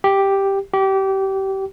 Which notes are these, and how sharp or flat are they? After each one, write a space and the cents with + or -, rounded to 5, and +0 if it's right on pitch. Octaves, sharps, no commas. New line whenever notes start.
G4 +0
G4 -25